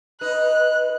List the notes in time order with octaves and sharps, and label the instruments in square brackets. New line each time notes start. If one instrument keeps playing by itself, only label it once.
[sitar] D#4 [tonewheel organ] B4 [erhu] F#6